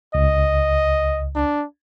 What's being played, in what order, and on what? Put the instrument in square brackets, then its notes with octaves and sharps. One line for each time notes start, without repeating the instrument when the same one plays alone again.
[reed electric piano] C#2 [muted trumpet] D#5
[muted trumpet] D4